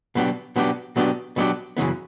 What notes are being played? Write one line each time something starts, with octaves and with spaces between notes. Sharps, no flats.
B2 F#3 B3 D4 G4
B2 F#3 B3 D4 G4
B2 F#3 B3 D4 G4
B2 F#3 B3 D4 G4
F#2 C#3 E3 B3